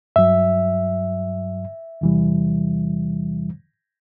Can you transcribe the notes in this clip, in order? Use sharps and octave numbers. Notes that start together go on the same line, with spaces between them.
G2 F#3 E5
E2 C3 E3 G3